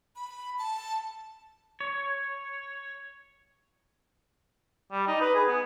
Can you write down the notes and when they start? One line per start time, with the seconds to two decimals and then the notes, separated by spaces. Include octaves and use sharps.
0.16 B5
0.59 A5
1.81 C#5
4.92 G3
5.08 D#4
5.21 B4
5.35 G#4
5.48 B3